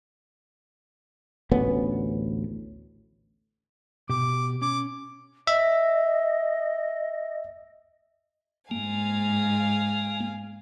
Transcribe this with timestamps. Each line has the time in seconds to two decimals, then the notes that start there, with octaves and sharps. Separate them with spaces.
1.51 A1 D2 B3 C#4
4.09 B2 G4 D6
4.62 C#4 D6
5.47 D#5 E5
8.71 G#2 A#3 F5 G#5